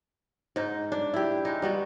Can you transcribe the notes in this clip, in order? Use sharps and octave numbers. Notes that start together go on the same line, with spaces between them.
G#2 D#4
D4
E4 G4
G#3 D#4
G3 B3 F#4